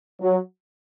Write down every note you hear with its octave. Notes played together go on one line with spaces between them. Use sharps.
F#3